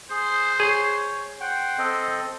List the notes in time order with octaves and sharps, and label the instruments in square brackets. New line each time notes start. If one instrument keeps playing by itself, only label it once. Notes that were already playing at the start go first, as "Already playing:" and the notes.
[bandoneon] G#4 [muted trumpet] C5
[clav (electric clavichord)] G#4 [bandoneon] C#5
[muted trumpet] C5 [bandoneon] F#5 G5
[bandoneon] C4 A4 D#5